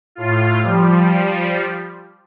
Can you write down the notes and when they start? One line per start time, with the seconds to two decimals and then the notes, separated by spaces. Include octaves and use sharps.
0.15 A2 F4
0.62 F3 G3